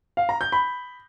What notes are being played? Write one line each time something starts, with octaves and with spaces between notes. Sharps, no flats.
F5
A#5
G6
B5